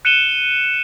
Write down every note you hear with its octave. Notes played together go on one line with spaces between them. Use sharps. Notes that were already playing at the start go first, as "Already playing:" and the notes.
F#6 C#7 D#7 E7 G7